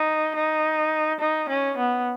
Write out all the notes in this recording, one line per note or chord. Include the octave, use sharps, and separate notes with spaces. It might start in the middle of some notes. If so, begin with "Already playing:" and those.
Already playing: D#4
D#4
D#4
C#4
B3